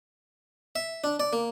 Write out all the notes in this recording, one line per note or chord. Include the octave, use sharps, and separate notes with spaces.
E5
D4
D5
A#3